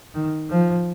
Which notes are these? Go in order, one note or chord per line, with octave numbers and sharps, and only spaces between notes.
D#3
F3